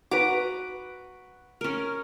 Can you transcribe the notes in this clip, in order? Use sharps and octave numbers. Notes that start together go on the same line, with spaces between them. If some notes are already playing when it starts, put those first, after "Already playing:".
F#4 B4 A#5 D6
C#4 A#4